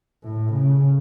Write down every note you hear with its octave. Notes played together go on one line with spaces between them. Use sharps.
A2
C#3